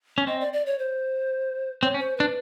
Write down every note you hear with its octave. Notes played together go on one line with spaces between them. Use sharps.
C#4
C4 D#5
D5
D5
C#5
C5
C4 C#5
C#4
C5
D4 B4